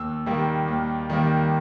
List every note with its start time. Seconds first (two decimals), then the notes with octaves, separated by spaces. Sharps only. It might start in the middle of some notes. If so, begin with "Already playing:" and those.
Already playing: D#2 E6
0.26 D#3 G3 A#3
0.68 D#2
1.10 D#3 G3 A#3